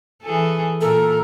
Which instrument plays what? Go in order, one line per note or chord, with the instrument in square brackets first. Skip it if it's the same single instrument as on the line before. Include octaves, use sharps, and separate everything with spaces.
[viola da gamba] E3 G#4 A4
[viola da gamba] A#2 A#4 [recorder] A4